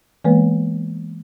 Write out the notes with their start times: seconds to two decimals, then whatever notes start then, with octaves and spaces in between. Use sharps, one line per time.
0.24 E3 G#3 A#3 B3 B4